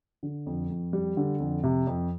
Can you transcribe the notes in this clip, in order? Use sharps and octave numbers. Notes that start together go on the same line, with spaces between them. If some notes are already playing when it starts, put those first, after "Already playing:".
D3
F2
F2
G3
D3
F2
C3
F2